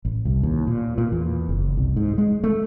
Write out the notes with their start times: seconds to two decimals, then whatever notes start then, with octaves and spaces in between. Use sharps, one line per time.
0.05 A1
0.25 C2
0.43 D#2
0.67 A#2
0.98 A#2
1.12 E2
1.49 F#1
1.77 C2
1.96 G#2
2.18 G#3
2.44 A3